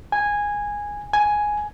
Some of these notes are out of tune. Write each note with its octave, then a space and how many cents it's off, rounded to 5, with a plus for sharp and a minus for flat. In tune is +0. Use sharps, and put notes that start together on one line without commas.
G#5 -10
G#5 +5